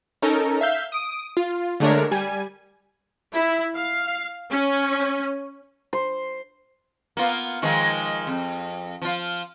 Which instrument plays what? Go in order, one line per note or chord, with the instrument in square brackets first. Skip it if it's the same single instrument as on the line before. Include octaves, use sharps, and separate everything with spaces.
[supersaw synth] C#4 D#4 A4 A#4
E5 F5 G6
D#6 D7
F4
D3 G#3 A3 D4 A#4 C#5
G3 G#5
[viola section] E4
F5
C#4
[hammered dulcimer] C5
[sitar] A#3 B3 F4
D#3 F3 G#3
F2
F3 F4